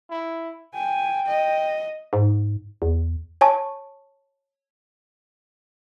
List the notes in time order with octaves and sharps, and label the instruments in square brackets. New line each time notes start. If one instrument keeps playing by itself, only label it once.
[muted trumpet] E4
[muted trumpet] G5 [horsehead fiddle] G#5
[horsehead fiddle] D#5
[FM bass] G#2
E2
[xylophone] C#5 G#5 A5 C#6